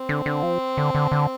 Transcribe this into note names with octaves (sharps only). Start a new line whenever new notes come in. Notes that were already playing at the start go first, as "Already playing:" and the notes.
Already playing: C4
D3
D3
F3
D3
D3
D3